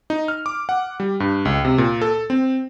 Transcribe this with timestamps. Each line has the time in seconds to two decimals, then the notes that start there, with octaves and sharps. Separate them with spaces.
0.10 D#4
0.28 F6
0.46 D6
0.69 F#5
1.00 G3
1.20 G2
1.45 C#2
1.65 C3
1.78 A#2
2.02 A4
2.30 C4